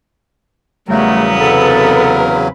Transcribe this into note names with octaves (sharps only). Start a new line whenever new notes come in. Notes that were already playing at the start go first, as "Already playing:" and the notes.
E2 C#3 F#3 G3 A3 B3 A#4
C3 A4 B4